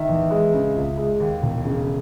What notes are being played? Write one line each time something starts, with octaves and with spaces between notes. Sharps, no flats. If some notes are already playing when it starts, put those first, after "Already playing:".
Already playing: D#3 E5
E2
G#3
C#3
C#2
G#3
D#2
E1
C#3